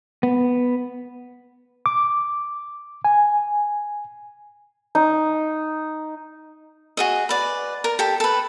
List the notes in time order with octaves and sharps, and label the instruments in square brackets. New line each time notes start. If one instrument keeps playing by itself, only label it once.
[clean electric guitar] B3
[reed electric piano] D6
G#5
[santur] D#4
[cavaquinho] F#4 G#4 D#5
B4 D5
A#4
G4 A4
A4 B4